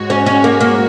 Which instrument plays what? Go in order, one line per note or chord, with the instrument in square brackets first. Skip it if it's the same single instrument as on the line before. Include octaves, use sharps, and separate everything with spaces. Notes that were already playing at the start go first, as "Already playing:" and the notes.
Already playing: [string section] G#2 G#3 F#4 C#5
[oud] C#4
C#4
A#3
A#3